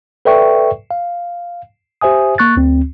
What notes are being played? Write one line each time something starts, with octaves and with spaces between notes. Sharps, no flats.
A4 B4 D5 E5 G5 C#6
F5
G4 C5 E5 G#5 D#6
A#3 C#6 F#6 A6
D2 C4